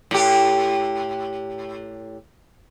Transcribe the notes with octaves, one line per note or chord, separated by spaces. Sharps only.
A2 G4